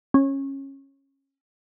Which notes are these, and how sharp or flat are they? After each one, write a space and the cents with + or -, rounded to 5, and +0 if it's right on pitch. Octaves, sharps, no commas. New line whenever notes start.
C#4 -20